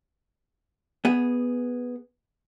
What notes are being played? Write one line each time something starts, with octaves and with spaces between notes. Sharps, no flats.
B3 G#4